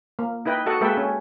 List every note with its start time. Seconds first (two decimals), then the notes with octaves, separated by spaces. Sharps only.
0.19 A#3
0.45 D#4 E4 B4 D#5 G5
0.66 F#4 A4 D#5 F#5
0.81 G#3 A#3 A4 B4 E5 G5
0.97 C#4